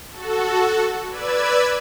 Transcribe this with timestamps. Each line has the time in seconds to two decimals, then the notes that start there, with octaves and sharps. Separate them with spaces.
0.12 F#4 A4
1.09 B4 D5 E6 G#6